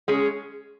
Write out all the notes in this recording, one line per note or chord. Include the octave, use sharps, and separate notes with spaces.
G#3 C#4 G#4